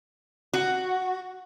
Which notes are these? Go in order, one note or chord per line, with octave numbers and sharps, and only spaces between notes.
F#4